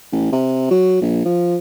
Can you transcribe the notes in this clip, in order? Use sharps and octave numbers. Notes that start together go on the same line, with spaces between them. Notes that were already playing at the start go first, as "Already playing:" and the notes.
A1
C3
F#3
A#1
F3